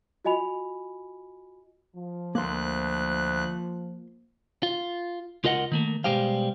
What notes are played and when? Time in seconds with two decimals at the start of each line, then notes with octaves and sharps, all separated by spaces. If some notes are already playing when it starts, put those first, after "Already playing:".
0.25 F4 F#4 D#5 G#5 B5 F7
1.96 F3
2.35 D2 A#3 C6 F#6
4.63 F4
5.44 C#2 F4 A#4 D#5 E5 F#5
5.72 D#3 A3 A#3
6.04 B2 G3 G#3 G4 C5 F5